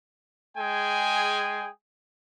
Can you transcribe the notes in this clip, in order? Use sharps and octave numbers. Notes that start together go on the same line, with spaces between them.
G#3 G#4 G5 G#5